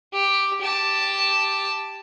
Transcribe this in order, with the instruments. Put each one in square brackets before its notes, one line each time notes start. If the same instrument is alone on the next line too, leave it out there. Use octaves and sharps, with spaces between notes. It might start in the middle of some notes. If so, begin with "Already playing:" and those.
[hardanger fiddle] G4
G4 A5